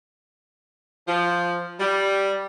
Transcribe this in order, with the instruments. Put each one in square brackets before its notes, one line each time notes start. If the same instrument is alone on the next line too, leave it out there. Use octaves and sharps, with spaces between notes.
[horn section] F3
G3